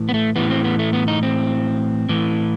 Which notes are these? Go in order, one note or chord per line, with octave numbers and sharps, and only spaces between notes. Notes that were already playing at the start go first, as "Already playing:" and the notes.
Already playing: A2 E3
B3
A3
A2 E3 B3
C4
B3
A3
B3
D#4
C4
A2 E3